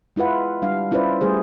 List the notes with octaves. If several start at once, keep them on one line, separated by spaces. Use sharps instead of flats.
G#3 E4 F4 B4 F#5
G3 D4 F5
C#4 E4 F4 B4 C5 D5
G3 A3 G#4 C5